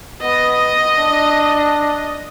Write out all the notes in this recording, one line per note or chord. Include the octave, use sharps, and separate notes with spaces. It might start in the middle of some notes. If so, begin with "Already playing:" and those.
B3 D#5
D4